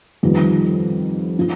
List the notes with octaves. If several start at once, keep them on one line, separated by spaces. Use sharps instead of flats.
F2 D#3 G3 B3 F4
F3